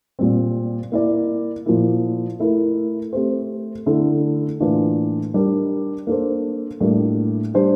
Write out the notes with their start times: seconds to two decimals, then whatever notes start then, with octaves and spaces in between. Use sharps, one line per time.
0.19 A#2 G3 C4
0.92 A#3 E4 A#4 D5
1.66 A#2 F3 A#3 E4
2.40 A3 E4 A#4
3.13 A3 C4 G4 C5
3.86 D3 A3 E4 A4
4.60 A2 E3 A#3 D4 F4
5.34 G3 D4 G4 A#4
6.07 A#3 D4 A4 C5
6.81 A2 G3 A#3 D4 F4
7.54 G3 D4 G4 C5